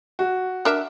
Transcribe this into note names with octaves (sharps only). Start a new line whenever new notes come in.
F#4
D4 A#4 E5